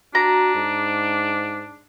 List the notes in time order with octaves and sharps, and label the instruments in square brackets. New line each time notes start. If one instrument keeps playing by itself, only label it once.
[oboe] D4 [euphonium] F#4 [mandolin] A#5
[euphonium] G#2